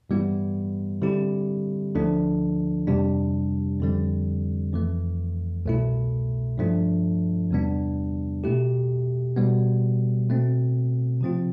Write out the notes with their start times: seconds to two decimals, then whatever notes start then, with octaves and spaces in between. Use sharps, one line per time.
0.10 G2 E3 G3 B3 E4
1.02 D3 G3 C4 E4 G4
1.95 D2 D3 F3 A3 D4
2.87 F2 C3 G3 D4
3.80 F2 D3 G3 C4
4.73 F2 E3 A3
5.66 C2 B2 A3 E4
6.58 G2 F3 A3 D4
7.51 E2 C3 G3 B3 D4
8.44 B2 A3 E4 G4
9.36 B2 G3 B3
10.29 B2 A3 C4
11.21 C3 F3 C4 F4